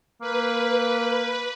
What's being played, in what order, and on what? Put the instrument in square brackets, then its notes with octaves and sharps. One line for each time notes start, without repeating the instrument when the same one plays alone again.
[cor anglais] A#3 [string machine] B4